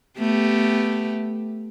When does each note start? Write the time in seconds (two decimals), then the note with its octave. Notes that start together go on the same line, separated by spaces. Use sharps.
0.19 A3 B3 G4